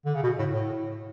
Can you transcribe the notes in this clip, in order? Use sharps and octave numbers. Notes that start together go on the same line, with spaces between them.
D3
C#3
B2
A2
A2